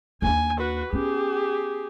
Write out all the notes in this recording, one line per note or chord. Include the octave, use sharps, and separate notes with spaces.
D#2 D4 G#5
F#4 B4
B3 C#4 G4 G#4